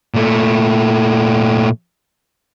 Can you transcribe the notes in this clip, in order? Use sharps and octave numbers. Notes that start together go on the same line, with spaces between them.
A#2 A3